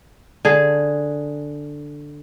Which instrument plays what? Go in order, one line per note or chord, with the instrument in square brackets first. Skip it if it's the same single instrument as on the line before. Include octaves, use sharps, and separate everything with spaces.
[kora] D3 G#4